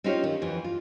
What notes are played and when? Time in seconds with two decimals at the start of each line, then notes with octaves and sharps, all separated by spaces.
0.04 C4 C#4 D#4 F4 G4 C#5
0.24 D#3
0.42 F2 E3
0.64 F4